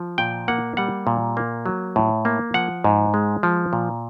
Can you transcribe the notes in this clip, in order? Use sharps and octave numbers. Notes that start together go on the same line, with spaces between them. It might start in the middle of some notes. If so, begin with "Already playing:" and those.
Already playing: F3
A#2 G5
A#3 F#5
G3 F#5
A#2
A#3
F#3
A2
A#3
F3 F#5
G#2
G#3
F3
A#2